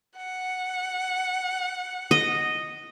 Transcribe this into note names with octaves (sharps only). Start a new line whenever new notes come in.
F#5
D#5